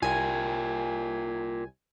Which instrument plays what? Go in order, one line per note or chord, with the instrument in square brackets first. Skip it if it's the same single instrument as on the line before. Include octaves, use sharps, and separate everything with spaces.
[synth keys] C2 G#5 [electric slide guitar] F4 A#4 G5